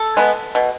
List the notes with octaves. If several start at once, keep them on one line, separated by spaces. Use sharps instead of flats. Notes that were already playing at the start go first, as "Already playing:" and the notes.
Already playing: A4
G#3 B3
B2